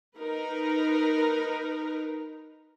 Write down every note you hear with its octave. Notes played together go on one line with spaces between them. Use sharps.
D#4 A#4 B4